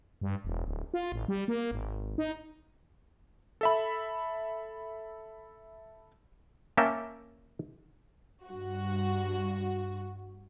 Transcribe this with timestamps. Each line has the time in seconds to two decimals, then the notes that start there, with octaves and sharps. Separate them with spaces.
0.21 G2
0.45 E1
0.65 D1
0.94 F4
1.12 A1
1.28 G3
1.48 A#3
1.71 G#1
2.18 D#4
3.61 A4 E5 B5
6.77 A#3 C#4 E5 G5 A5 A#5
8.47 G2 F#4